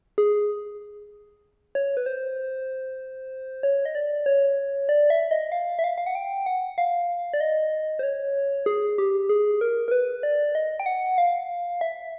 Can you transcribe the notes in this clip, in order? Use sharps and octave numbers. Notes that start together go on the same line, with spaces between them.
G#4
C#5
B4
C5
C#5
D#5
D5
C#5
D5
E5
D#5
F5
E5
F5
F5
F#5
G5
F#5
F5
D5
D#5
C5
C#5
G#4
G4
G#4
A#4
A#4
B4
D5
D#5
G5
F#5
F5
E5